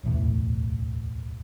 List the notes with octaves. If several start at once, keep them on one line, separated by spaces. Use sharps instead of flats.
D1 B1 E2 A2